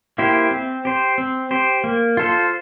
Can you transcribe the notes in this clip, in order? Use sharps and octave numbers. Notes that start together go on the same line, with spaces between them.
A#3 E4 G4 C5
C4
G4 C5
C4
G4 C5
A#3
F4 A4 C5